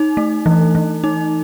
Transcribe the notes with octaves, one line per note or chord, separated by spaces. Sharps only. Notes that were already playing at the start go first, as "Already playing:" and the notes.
Already playing: D#4
A3
E3
E3
D#4